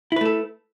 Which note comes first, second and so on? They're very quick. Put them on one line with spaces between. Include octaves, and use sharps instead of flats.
E4 B4 A3 A4